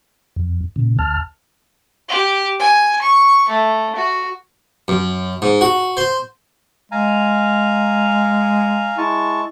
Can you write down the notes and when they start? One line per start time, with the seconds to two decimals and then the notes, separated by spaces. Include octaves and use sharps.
0.36 F2
0.76 A#2 C#3
0.99 D2 A5 F6
2.09 G4
2.60 G#5
3.02 C#6
3.48 A3
3.95 F#4
4.88 F#2
5.42 G#2
5.61 F#4
5.97 C5
6.92 G#3 F5 G#5 A#5
8.98 G#3 E4 A5 C#6